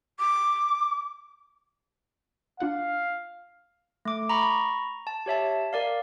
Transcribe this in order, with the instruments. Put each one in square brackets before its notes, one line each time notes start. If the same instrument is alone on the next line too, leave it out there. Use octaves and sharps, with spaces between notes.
[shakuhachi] D6
[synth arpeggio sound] D4 F4 F#5 [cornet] F5
[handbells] A3 D6
A#5 B5 C#6
A5
G4 C#5 E5 A5
A#4 D5 F5